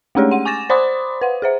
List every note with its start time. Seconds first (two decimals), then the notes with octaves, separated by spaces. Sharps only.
0.15 G#3 A3 C#4 G4 G#4 C#5
0.31 F#5 D#7
0.45 G#5 C#6 D6 A6 A#6 E7
0.70 C5 D5 B5 C6 D6 D#6
1.21 B4 F#5
1.42 G#4 C5 E5